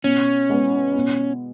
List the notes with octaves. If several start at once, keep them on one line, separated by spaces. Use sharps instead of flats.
B2 C#4
G#3 B3
B2